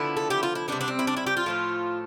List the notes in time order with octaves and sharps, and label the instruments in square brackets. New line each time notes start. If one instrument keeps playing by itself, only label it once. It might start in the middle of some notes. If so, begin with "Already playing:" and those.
Already playing: [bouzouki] D3 F3 B3 E4
A4
G4
F4
E4
C3 G3 B3 D4
D4
C4
E4
D4
E4
G4
F4
A2 F3 A3